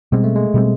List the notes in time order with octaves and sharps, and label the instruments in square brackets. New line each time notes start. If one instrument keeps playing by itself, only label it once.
[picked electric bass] B2 G3 C4 [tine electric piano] G#3
[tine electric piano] A3
G#3
[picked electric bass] B2 G3 C4